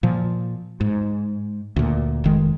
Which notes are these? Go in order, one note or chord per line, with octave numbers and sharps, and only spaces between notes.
A#2 F3
G#2
D2 A#2
F1 D#3 G#3